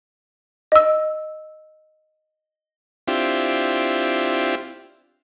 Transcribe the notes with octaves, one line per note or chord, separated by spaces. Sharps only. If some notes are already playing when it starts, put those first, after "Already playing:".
D#5 E6
C4 D4 E4 F4 G4